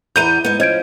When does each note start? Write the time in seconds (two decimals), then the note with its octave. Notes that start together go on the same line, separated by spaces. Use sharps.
0.16 E2 B3 A#5 G6 D#7
0.45 G#2 B3
0.60 F3 C#4 D#5 G#6 D7